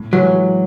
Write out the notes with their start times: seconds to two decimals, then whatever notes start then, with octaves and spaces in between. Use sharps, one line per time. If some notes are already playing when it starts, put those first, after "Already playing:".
Already playing: A2
0.13 E3 F#3 G#3